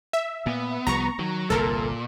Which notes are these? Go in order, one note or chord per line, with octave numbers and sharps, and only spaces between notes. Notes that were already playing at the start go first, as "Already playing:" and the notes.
E5
A#2 B3
C2 F3 G3 A#5 C#6
D#3 F#3
G1 C2 A#2 A4 A#4